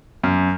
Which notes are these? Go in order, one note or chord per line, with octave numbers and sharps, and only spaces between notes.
F#2